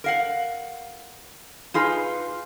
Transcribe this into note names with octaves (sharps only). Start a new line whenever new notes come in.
A#4 F5 F#5
D#4 F4 G#4 B4